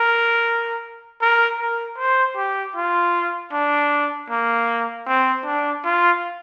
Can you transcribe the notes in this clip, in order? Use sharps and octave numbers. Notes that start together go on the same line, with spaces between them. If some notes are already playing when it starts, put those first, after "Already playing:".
Already playing: A#4
A#4
A#4
C5
G4
F4
D4
A#3
C4
D4
F4